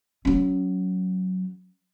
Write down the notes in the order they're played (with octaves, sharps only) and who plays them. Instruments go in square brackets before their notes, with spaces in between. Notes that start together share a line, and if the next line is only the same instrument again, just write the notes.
[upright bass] F#3 C#4